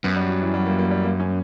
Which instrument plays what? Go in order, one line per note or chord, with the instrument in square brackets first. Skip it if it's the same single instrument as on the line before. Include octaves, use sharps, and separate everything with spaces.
[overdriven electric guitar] F#2 [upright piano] B3
[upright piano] G3
F#3
E3
G3
A#3
A#3
G3
A#3
C#4